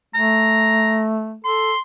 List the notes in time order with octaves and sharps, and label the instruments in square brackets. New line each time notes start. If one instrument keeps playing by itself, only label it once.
[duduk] A3 [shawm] A#5
[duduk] A4 [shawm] C6